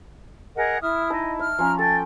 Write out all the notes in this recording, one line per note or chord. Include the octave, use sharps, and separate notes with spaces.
G#4 A#4 D#5 F#5
E4 E5 D#6 F6
D#4 D#5 A5 D6
E5 F6
F3 C#4 A#5
A4 G5 A6